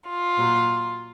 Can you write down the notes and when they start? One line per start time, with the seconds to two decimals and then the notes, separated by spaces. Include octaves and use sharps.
0.08 F4
0.37 A#2 F#3